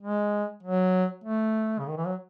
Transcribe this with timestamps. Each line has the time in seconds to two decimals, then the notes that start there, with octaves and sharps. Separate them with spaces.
0.02 G#3
0.63 F#3
1.24 A3
1.79 C#3
1.88 D#3
1.97 E3
2.06 F#3